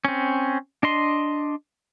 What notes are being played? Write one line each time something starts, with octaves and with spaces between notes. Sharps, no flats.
C4 C#4
D4 D#5 C6